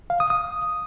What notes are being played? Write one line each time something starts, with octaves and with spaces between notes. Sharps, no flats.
F5
D#6
D#6